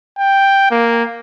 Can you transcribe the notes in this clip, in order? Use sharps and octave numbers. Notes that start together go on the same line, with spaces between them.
G5
A#3